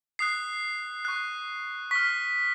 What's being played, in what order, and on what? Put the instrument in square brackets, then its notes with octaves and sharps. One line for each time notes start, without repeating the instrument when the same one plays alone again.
[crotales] D#6 F#6 C7
C#6 F#6
C#6 F6 B6